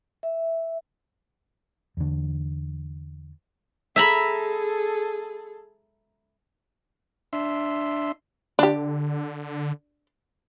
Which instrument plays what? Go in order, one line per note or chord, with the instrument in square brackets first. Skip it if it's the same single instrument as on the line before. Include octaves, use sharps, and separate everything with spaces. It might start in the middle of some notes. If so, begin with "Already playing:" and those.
[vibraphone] E5
[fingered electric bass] E2 D3
[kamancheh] G#4 A4 [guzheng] E5 A#5 B5
[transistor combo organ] D4 E5 C6
[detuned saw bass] D3 [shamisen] D4 G4